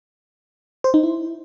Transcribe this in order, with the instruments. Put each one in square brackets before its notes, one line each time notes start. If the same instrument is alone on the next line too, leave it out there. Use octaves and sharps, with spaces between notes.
[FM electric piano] C5
D#4
E4